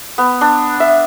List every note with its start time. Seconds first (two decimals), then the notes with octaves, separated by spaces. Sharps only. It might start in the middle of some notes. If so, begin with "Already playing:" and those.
0.18 B3
0.41 D4
0.80 E5